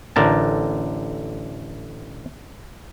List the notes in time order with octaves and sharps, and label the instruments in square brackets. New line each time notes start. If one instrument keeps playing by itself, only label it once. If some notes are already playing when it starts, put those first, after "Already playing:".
[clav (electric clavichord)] A1 D3 A#4 A5